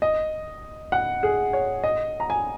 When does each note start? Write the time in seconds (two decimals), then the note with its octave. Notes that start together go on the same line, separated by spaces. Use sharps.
0.02 D#5
0.92 F#5
1.23 G#4
1.53 C#5
1.84 D#5
2.20 A#5
2.30 G#5